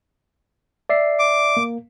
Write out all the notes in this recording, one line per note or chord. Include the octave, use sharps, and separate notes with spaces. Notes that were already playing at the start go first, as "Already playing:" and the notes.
D5 E5 C7
D6
A#3